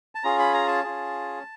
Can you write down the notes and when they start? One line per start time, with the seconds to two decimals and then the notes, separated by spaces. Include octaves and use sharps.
0.15 A5
0.23 C#4 F4 G#4 A#5
0.39 B5
0.54 A#5
0.68 A5
0.84 C#4 F4 G#4